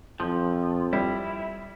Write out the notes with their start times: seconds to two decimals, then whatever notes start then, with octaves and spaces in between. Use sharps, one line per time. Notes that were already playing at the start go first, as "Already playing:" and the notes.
0.20 F2 F3
0.93 G3 E4